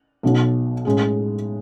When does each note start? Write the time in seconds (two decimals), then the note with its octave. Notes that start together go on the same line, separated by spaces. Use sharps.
0.23 B1 B2 F#3
0.85 A2 G#3 C#4 G#4